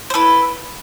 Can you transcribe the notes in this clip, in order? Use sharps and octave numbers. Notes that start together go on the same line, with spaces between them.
C5
E4 A4 B4